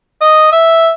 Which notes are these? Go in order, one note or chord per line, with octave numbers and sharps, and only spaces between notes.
D#5
E5